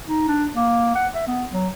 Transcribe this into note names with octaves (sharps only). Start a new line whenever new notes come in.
D#4
D4
A#3
F#5
E5
B3
F#3